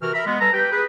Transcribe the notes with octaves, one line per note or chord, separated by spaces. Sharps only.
C3 E3 F#4 A#4 F6
A#4 E5 B5
G#3 B3
G3 A4 B4 A5 A#5
G4 B4 G5
G#4 B4